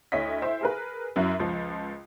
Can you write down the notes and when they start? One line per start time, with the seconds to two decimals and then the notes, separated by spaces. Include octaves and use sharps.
0.12 D2 E4 C#5 D#5 B6
0.42 E4 C5 E5
0.61 G#4 A#4 B4
1.16 F#2 F#3 E4
1.40 C#2 F3